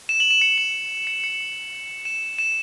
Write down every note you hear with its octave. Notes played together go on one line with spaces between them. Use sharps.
E7
F#7
E7
C#7
E7
C#7
C#7
E7
E7